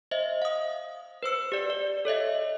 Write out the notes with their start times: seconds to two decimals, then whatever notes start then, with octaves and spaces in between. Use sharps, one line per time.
0.11 C5 D#5 E5
0.42 F5 D#6
1.23 B4 C5 E6 C#7
1.52 G4 D5
1.70 D5
2.05 A4 C#5 D#5 E5